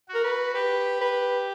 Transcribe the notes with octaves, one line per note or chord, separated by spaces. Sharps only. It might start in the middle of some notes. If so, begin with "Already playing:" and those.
F#4
A#4
B4
G4 B4
B4